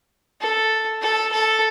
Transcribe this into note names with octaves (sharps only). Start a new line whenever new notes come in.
A4
A4
A4